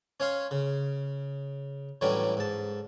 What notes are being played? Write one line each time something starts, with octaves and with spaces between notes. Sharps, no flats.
C#4 C#5 F5 C6
C#3
A2 E3 F#3 G3 C#4 D4
G#2 A5